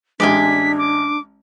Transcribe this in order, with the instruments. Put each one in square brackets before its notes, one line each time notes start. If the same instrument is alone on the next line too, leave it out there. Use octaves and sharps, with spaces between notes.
[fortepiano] A1 G#3 [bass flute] D4 [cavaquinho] D5 G5 G#5 [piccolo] B6
[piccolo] D6